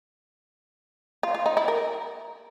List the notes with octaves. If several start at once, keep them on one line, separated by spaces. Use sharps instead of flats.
F4
F4
D#4
E4
A#4